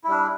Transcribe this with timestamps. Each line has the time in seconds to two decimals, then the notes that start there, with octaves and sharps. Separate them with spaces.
0.04 E4
0.08 G3
0.11 D4